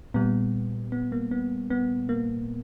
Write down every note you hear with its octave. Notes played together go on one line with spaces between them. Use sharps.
A#2 G3 B3
B3
A#3
B3
B3
A#3